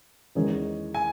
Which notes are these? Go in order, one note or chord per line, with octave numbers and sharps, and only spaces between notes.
E2 D#3 G#3 C#4 G#4
G#5